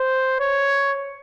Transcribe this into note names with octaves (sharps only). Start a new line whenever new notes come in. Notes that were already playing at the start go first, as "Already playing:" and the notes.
Already playing: C5
C#5